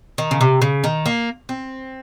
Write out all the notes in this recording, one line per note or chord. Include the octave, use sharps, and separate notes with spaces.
D#3
C#3
C3
C#3
D#3
A#3
C4